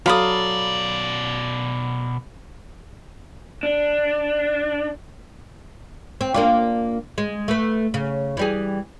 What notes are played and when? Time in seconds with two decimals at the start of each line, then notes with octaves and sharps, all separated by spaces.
0.06 B2 F#3 A4 D5 F5 B5 D#6
3.63 D4
6.21 C4
6.34 A#3 D4 F4
7.18 G#3
7.48 A3 B4
7.94 C#3
8.37 E3 G3 G#4